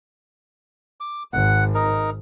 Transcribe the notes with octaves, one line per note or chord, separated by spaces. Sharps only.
D6
G#1 F#5
D#4 A#4